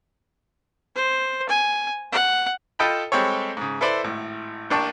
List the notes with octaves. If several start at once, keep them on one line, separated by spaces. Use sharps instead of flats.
C5
G#5
F#5
F4 A4 D#5 G5 A5 B5
G3 G#3 C4 G4 A4 C#5
G#2 C#3
E4 A4 B4 C5 D5
G#1 A2
A1 A#3 D4 G5 A5 C#6